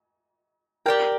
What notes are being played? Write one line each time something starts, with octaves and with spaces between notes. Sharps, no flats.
G4 A#4 D5 G5